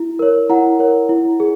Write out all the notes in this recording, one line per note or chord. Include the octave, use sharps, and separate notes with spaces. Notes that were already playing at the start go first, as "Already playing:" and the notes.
Already playing: E4
A#4 C#5
E4 F#5 A#5
A#4 C#5
E4
G#4